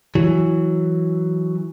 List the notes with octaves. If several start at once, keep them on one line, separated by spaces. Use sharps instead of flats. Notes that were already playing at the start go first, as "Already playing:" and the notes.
E3 F#3